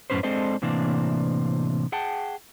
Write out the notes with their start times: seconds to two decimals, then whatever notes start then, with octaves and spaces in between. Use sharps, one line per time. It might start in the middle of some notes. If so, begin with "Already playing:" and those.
0.10 F#2 A2 C3 C#4 B4 C5
0.23 G#3 C4 D4 A4 C5 D#5
0.62 A2 C3 E3 A#3 C4 D4
1.92 G#4 F#5 G5 A5